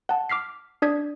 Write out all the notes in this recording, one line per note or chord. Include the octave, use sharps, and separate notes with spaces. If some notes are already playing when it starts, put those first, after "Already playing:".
F#5 A5
D6 F6 B6 C7
D4 D5 D#6 G#6 B6